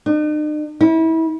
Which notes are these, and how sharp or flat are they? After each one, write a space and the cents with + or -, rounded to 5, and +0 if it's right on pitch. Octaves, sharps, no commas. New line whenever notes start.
D#4 -45
E4 -30